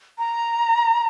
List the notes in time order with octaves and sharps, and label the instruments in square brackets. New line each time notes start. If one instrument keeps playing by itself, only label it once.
[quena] A#5